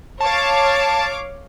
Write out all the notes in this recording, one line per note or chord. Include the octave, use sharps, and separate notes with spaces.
C#5 F5 A5 D6